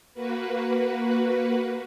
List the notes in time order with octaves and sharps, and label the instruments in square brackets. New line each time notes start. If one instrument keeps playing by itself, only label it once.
[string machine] A#3 F#4 B4